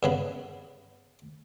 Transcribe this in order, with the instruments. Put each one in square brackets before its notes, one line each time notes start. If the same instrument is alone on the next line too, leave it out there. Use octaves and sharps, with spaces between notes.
[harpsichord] G2 C#3 B3